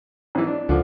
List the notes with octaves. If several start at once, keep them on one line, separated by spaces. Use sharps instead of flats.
G#1 E3
D4
C#2 D3 F3